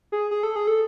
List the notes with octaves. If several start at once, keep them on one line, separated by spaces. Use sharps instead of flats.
G#4
G#4
A4
G#4
A4